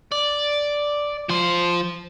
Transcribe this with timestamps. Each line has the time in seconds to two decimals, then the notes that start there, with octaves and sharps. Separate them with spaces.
0.12 D5
1.29 F3 C5